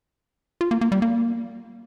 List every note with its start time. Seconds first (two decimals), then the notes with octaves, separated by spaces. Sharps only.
0.61 F4
0.71 A#3
0.81 A#3
0.92 G3
1.02 A#3